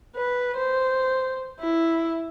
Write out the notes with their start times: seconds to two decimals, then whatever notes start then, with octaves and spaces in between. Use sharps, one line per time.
0.16 B4
0.57 C5
1.60 E4